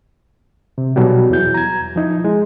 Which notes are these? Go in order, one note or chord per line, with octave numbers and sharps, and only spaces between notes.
C3
B2 F#3 G3
E2 E3 G6
A#5 G#6
F3 D#4 E4
G#3